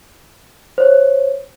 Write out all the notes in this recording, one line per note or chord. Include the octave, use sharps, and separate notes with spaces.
C5 C#5